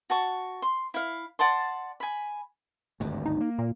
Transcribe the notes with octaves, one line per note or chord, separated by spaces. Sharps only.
F#4 A5 C#6
C6
E4 F5
D5 F#5 A5 C6
G#5 B5
G#1 D2 G2
D#4
A#3
A#2